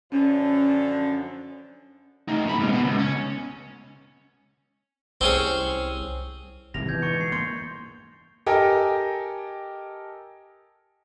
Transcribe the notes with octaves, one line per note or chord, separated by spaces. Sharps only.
F#2 D3 F3 C#4
A3 D#4
A2 B5
G#2 C3
B2 B3
C#2
C#4
C2 C4 C#4 G#4
G#1 C3 E3 G3 A#6 F7
E2 B2 G6 G#6
G#2 D3 C#6 A6 C#7
C#6 C7
A#3 C6 G6
G4 A4 A#4 D#5 G5 G#5